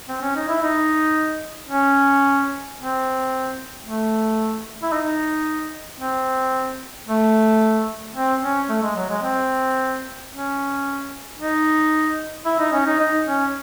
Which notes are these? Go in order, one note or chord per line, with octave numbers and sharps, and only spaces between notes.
C4
C#4
D#4
E4
D#4
C#4
C4
A3
E4
D#4
C4
A3
C4
C#4
A3
G#3
F#3
G#3
C4
C#4
D#4
E4
D#4
C#4
D#4
D#4
C#4